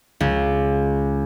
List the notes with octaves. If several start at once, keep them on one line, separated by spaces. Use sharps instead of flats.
C#2